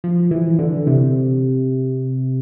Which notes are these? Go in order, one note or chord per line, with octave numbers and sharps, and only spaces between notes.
F3
E3
D3
C3